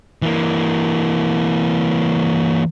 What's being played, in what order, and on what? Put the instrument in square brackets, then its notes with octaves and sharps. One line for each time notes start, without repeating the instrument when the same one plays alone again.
[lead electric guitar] E3 A#3